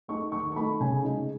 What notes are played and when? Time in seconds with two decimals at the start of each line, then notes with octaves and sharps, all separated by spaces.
0.08 A3 D#4 C#6
0.32 D#3 C#6
0.52 C#6
0.56 A3 B5
0.61 D#4
0.80 C#3 G#5
1.04 G#3 D#4